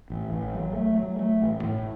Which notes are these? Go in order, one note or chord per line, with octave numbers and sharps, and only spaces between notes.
A1
A1
F#3
A3
F#3
A3
A1
A2